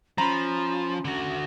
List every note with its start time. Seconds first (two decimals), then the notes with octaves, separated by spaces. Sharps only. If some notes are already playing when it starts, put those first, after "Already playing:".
0.18 F3 C#4 A#5 B5
1.05 D3 F#4